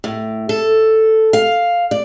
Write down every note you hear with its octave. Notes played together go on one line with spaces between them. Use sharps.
A2
A4
F5
D5